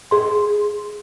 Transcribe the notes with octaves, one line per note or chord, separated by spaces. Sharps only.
G#4 C6